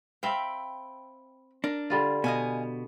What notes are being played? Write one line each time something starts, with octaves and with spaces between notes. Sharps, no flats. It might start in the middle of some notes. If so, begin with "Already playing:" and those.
C4 E5 F5 G5 B5
D4 A#4
D3 G3 F4
B2 D#5 F5 G#5